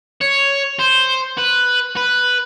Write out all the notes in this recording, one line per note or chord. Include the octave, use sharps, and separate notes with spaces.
C#5
C5
B4
B4